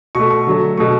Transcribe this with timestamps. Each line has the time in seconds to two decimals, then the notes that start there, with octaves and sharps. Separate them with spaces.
0.15 B2 A3 C#6
0.31 C#6
0.46 D3 F#3 A3
0.77 B2 A3 C#6